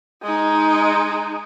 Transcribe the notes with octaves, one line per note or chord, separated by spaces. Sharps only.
G#3 D#4